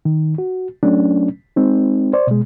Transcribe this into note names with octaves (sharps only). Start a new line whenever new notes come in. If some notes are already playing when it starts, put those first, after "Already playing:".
D#3
F#4
F#3 A3 C#4 D4
G#3 C4 D#4
C5 D5
B2 G#3